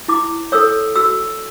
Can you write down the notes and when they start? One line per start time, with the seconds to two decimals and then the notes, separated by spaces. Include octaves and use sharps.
0.08 E4 D6
0.52 A4 C#5 E6
0.96 F#4 E6